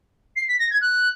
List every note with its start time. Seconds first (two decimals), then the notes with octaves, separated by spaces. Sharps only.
0.36 C7
0.48 B6
0.59 A#6
0.70 G#6
0.81 F#6